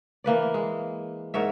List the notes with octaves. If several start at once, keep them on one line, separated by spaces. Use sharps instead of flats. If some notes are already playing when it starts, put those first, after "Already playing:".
E3 A#3 B4 D5
G#3
G#2 A#4 C#5 E5